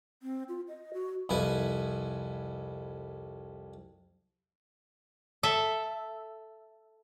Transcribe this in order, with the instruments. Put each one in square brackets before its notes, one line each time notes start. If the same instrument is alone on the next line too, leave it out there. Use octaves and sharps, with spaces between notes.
[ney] C4
F4
D#5
F#4
[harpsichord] C2 F2 E4 B4 G#5
[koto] A4 E5